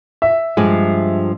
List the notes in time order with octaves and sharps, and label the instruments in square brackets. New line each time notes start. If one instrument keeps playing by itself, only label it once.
[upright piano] E5
[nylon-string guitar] G2 F3 G#3